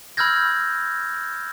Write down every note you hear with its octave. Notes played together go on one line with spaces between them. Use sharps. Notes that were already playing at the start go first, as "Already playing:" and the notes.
B5 E6 F6 G6 G#6 A#6